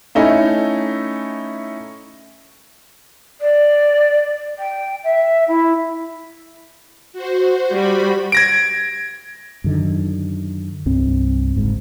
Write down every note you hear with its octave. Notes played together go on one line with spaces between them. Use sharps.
A3 C#4 D#4 E4
D5
G5
E5
E4
F#4 C5
G3 F#4 C5 B5
G#6 A#6 D7
F#2 D3 D#3
C2 G2 C4
F#1 G#2